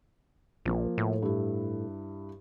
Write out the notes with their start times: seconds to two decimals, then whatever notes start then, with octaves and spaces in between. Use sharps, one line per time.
0.65 A#1 F3 A#3
0.98 A2
1.22 G2 E4